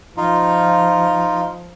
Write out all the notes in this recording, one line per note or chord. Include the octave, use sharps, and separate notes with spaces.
F3 D#4 F4